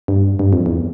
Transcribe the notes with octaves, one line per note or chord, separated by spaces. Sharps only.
G2
G2
F2
E2